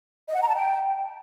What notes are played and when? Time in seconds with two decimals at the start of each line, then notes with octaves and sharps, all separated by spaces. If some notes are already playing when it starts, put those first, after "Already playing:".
0.28 D#5
0.35 F#5
0.42 A#5
0.48 A5
0.55 G5